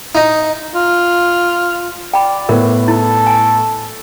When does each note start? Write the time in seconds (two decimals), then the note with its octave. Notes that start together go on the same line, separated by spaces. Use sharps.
0.15 D#4
0.75 F4
2.14 D5 G5 B5
2.49 A2 B3 A#4
2.88 E4 A4
3.27 G#5